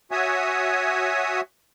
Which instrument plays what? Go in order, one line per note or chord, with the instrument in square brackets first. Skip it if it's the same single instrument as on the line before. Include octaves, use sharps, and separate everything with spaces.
[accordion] F#4 C#5 E5 G#5 D#6